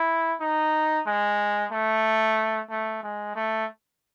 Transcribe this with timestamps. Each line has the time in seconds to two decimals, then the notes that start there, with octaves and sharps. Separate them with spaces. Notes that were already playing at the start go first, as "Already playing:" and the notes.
Already playing: E4
0.41 D#4
1.07 G#3
1.72 A3
2.70 A3
3.03 G#3
3.35 A3